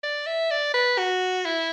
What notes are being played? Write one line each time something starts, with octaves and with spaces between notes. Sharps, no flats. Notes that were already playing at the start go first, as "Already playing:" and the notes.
D5
E5
D5
B4
F#4
E4